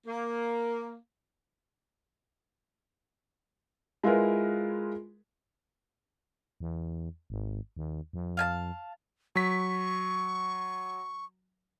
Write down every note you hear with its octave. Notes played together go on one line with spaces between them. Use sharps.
A#3
G#3 E4 F4 G#4 A#4 B4
E2
G#1
D#2
F2
F5 G#5 A5
F#3 C#6 B6